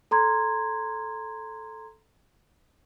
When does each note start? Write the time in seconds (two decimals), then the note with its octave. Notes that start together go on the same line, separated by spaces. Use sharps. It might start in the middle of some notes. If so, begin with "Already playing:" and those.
0.11 A4 A#5 C6 G#6